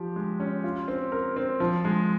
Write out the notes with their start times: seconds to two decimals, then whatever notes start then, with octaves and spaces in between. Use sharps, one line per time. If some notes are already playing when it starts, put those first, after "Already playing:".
Already playing: F3 G4
0.16 G#3
0.40 C#4
0.64 F4
0.88 C4
1.12 A#4
1.36 C4
1.60 F3
1.85 G#3